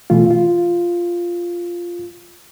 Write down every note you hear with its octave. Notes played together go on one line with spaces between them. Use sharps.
B2 E3 A3 F4
F4